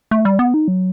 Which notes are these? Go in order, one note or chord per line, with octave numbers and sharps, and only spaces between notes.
A3
G3
B3
D#4
F#3